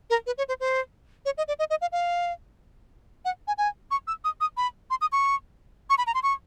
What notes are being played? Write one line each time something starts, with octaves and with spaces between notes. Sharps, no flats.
A#4
B4
C#5
C5
C5
C#5
D#5
D5
D#5
D#5
F5
F5
F#5
G#5
G#5
C#6
E6
D#6
D#6
B5
C6
D#6
C#6
C#6
B5
A#5
C6
C#6